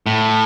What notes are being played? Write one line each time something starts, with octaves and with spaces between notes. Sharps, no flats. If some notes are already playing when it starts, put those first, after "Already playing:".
A2